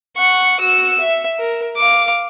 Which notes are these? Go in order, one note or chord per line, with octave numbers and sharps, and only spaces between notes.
F#5 C#6
F#4 E6
E5
A#4
F5 D6